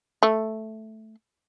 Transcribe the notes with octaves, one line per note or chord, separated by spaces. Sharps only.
A3